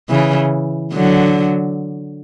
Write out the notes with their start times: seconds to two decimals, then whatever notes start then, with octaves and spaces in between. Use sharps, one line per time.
0.09 C#3 E3
0.93 D3 F#3